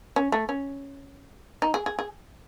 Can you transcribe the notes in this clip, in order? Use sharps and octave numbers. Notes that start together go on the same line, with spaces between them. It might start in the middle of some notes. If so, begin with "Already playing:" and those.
C#4
A3
C#4
D#4
G#4
G#4
G#4